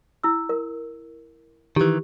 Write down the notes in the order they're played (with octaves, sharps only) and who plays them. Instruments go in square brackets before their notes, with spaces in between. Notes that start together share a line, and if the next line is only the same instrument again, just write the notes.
[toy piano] E4 E6
A#4
[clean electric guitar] D#3 E3 [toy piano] G4